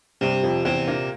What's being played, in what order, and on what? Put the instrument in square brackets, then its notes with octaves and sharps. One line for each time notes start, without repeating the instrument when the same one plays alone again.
[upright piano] G2 G3 [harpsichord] C3
[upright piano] F2 F3
[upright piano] E2 E3 [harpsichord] C3
[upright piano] A#2 A#3